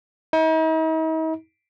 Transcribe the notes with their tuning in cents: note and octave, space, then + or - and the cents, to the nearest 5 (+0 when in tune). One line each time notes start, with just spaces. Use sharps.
D#4 +45